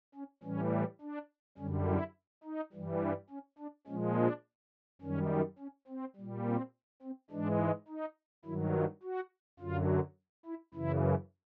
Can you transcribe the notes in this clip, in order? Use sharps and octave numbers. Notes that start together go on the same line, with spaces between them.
C#4
A2 E3 G3 C#4
D4
F#2 D3 G3 C#4
E4
D#4
G2 E3 G3
D4
C#4
D4
A#2 F3 G#3 C#4
D4
F#2 D#3 G3 C#4
C#4
C4
A#2 G3
C4
C4
G#2 E3 G#3 D4
D#4
G2 D#3 F#3 E4
F4
F#4
F#2 D3 F#3 F4
E4
F#2 C#3 E3 E4